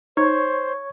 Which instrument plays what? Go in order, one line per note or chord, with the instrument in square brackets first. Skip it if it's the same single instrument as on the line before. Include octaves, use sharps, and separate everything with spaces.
[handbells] D#4 [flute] C5 [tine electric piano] C#5 C#6 G#6